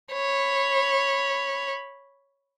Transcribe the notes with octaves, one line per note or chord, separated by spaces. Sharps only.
C#5 B5